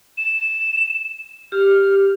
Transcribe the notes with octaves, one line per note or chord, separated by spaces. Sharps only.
E7
G4 F6